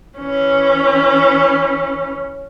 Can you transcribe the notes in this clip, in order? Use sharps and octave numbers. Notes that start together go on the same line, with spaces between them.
E3 C#4